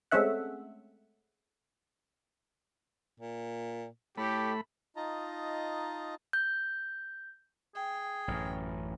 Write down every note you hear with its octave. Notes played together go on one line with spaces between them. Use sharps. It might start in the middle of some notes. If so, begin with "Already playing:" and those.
G#3 A3 C4 C#4 E5 F#5
A#2
A2 A3 G4 B5
D#4 F4 D#5 A5 A#5
G6
G#4 G5
A1 F#2